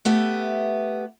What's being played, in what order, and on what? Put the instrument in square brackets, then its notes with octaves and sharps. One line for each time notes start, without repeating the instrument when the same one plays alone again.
[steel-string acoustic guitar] A3 B3 G4 E5